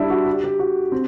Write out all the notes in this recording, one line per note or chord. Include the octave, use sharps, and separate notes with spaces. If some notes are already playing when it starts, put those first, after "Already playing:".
Already playing: G3 D4 E4
F#4
G4
G4
F#4
C4